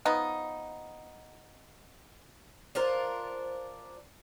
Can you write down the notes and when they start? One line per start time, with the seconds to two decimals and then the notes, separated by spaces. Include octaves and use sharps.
0.05 F3 B3 D#4
2.75 D4 F4 A#4 C5